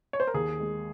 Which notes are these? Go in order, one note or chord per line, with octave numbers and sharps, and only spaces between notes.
C#5
C5
A#4
D#2 G#4
G#3